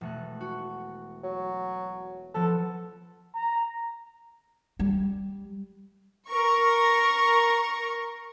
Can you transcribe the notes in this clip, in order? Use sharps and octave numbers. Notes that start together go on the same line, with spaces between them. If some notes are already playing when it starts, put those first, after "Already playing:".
E1 A3 F#6
F#4
F#3
F3 B3 A4
A#5
G3
A#4 C#6